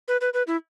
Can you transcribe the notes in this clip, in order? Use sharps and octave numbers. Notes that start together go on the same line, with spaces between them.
B4
B4
B4
E4